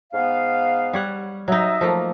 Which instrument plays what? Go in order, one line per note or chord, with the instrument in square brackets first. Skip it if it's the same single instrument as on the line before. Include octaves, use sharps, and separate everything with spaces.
[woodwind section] G#2 B3 F5
[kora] G3 C#5 F#5
[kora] F#3 D#4 [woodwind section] D#5 E5
[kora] F3 A3 A#3